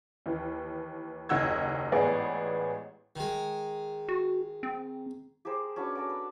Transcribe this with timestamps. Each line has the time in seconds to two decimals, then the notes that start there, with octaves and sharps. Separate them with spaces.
0.26 D#2 E3
1.29 F#1 D#2 D#4 F#5 E6 G#6
1.92 A1 G#2 B3 G#4 D5
3.16 D#3 G#3
4.09 F#4
4.63 C4
5.45 G4 G#4 A#4 C5
5.76 C#4 D4 F#4 B4
5.95 A4 A#4 F#5 D6
6.09 B4